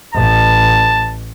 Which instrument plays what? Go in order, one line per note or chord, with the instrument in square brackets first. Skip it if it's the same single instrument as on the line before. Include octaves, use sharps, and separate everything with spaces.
[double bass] A1 [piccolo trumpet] A5